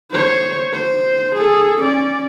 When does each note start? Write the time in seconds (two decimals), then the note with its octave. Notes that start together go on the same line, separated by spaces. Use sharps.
0.12 C5 C#5
0.74 C5
1.36 G#4 A4
1.81 C#4 D5